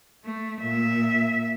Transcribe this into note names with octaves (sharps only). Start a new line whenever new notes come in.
A3
A#2 E5